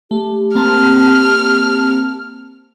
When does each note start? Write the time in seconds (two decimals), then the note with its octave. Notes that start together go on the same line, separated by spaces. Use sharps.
0.11 A3 G4
0.55 A#3 C4 A5 F6